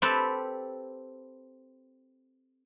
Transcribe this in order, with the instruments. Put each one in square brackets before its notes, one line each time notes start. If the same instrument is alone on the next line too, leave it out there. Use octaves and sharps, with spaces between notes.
[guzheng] C4 G4 A4 B4